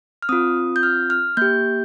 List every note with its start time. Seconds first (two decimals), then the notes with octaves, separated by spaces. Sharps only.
0.22 F6
0.29 C4 F4 D#6
0.76 G6
0.83 F6
1.10 F6
1.37 A#3 G4 G6